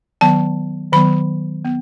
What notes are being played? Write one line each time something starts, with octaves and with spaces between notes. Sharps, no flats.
D#3 F#3 B3 A5
D#3 F#3 B3 B5
B3